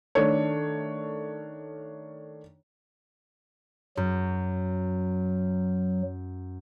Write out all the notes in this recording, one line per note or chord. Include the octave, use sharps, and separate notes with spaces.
D#3 A3 D4 C#5
F#2 F#3